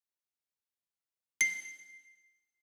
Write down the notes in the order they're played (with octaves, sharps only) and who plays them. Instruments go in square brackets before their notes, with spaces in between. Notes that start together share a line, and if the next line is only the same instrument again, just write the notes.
[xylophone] C7